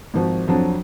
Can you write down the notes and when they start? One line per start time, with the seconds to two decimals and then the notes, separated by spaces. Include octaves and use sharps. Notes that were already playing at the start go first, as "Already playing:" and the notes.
0.14 G#1 F3 F#4
0.47 F2 F3 F#3 D4